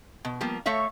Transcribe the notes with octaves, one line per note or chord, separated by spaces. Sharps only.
B2
F3 G3 A#3 B3
A3 A4 C#5 E5 F5